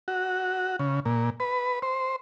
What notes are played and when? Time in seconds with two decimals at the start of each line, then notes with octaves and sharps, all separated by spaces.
0.08 F#4
0.79 C#3
1.05 A#2
1.40 B4
1.82 C5